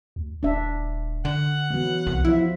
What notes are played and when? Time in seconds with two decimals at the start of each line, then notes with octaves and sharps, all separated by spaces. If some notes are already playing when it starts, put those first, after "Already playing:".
0.16 D2
0.43 D#1 D4 E5
1.25 D3 F#5
1.70 E3 F#3 B3
2.07 C2
2.25 F3 E4 E5